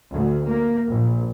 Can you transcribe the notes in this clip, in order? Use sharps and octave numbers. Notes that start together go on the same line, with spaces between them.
D2
A#3
A#1